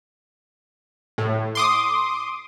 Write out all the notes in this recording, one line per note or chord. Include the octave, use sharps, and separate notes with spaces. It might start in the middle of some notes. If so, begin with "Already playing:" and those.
A2
C6 D6 D#6